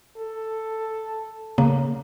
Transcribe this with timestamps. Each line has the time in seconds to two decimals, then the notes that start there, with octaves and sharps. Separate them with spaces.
0.17 A4
1.58 C#3 A#3